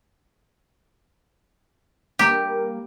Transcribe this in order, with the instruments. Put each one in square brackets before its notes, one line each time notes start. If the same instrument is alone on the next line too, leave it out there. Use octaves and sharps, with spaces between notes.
[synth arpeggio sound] G3 A#3 [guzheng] G4